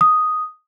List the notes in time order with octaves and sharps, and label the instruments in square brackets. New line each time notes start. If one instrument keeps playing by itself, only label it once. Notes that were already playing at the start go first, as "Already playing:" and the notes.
[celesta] D#6